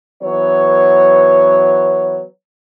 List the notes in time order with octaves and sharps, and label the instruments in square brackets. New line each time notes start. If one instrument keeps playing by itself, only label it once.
[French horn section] E3 F#3 B3 C#5